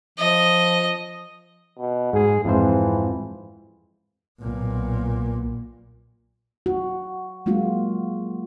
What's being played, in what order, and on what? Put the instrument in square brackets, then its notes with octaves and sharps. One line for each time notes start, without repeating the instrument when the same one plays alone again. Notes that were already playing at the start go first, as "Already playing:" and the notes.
[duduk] F3 [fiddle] D#5
[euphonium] B2
[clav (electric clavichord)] G#2 [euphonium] G#4
[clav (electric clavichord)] F2 G#2 C5 [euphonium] E3
[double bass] B1 A#2
[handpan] F#4
F#3 G#3 A#3 F4 F#4